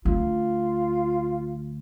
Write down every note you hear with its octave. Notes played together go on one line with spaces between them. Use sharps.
D2 F4